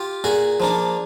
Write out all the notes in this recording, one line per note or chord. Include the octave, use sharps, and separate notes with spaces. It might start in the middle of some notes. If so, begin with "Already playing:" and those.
Already playing: F4 G4
A#2 F#4 G#4
F3 A#3 D4